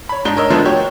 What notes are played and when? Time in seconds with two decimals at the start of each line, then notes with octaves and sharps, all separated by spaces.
0.09 C#5 B5
0.25 G#2 D4 D#4 G7
0.37 A#4 C#5 D#5 E6
0.50 D3 F3 G#3 A3 B3 D4
0.65 F#4 G4 C#5